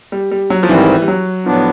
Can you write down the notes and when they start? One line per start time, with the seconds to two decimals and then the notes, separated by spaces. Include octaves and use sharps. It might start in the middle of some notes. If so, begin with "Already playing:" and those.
0.12 G3
0.31 G3
0.50 F#3
0.63 F3
0.69 G#2 D#3 E3 G3 C4
1.02 G3
1.08 F#3
1.46 A2 F3 F#3 B3 D4